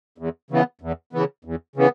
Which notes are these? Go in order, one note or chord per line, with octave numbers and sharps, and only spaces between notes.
E2
C#3 E3 B3
E2
C#3 E3 B3
E2
C#3 E3 B3